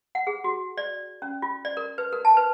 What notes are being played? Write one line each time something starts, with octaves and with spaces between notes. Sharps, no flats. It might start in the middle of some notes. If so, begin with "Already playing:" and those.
F#5
G#4
F#4
D5
C#4
F4
D5
A#4
B4
A#4
A5
B4